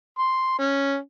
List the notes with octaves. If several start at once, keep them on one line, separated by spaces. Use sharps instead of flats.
C6
C#4